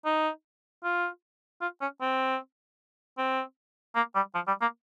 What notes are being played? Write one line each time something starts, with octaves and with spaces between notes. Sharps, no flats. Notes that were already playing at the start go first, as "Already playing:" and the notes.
D#4
F4
F4
C#4
C4
C4
A#3
G3
F3
G3
A#3